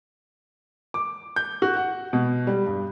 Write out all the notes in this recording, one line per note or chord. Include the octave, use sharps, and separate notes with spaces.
D6
G6
F#4
F#5
B2
G3
G2